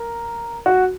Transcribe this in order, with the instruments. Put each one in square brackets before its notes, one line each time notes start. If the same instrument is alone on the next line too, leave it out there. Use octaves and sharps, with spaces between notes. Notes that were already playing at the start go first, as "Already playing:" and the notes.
Already playing: [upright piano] A#4
F#4